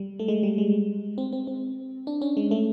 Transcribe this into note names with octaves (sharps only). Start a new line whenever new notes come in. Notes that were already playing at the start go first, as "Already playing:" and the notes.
Already playing: G3
A3
G#3
G3
G#3
C4
C4
C4
D4
C#4
G#3
A3